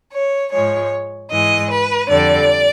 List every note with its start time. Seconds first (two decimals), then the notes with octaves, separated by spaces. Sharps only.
0.13 C#5
0.52 G#2 F3 G#3 C#5
1.31 G#2 E3 G#3 D#5
1.70 B4
2.09 F2 D3 G3 D5